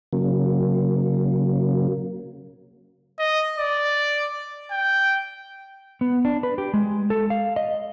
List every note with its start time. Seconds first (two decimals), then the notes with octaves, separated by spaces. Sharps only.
0.13 C#3 F#3 A#3
3.19 D#5
3.59 D5
4.71 G5
6.01 B3
6.25 D4
6.43 B4
6.58 G4
6.74 G#3
7.10 A4
7.30 F5
7.56 D#5